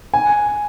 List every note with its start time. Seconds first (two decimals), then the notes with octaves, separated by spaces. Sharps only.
0.14 G#5